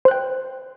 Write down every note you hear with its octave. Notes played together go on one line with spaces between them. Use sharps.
C5 G5 F#6